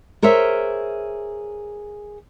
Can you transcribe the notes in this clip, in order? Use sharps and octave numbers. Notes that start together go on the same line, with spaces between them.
G#4 A#4 C5 C#5 E5